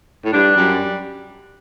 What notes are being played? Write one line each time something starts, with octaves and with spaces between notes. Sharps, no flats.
A2
G2 D4
F#2 G3